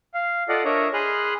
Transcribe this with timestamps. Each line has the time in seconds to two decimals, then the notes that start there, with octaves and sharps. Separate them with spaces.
0.14 F5
0.49 F4 A4 D5 D#5 F5 F#5
0.65 D4 A#4 C#5 D#5 E5 A#5
0.94 G#4 B5 C6 D#6 F6 F#6